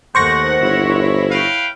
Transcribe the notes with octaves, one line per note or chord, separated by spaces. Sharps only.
D#2 D#3 A3 C5 F#5 C#6 A#6
G1 E4 C#5
B4 F5 G5